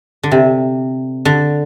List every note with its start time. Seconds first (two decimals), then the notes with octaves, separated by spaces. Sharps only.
0.23 D3
0.31 C3
1.25 D3